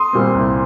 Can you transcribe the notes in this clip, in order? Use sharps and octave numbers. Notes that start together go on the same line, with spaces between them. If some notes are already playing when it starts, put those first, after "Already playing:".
Already playing: C6 D#6
A#2 G3 C4
C2